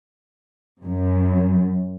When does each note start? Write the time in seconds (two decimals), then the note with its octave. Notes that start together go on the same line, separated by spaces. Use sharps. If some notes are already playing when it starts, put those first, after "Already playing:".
0.84 F#2